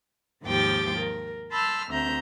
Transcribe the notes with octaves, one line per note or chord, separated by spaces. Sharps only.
D#2 G#2 F3 G4 G5 A6
A#4
A5 B5 C6 E6 F6 G6
D2 C4 E5 A#5 G6